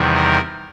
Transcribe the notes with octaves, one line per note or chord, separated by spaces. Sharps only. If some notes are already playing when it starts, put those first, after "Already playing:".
Already playing: E2 C3 D#3 G3
A#4